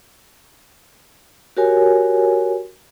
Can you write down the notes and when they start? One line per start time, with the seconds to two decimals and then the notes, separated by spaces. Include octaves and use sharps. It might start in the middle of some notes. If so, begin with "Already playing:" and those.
1.57 F#4 G4 A#4 C#5 G#5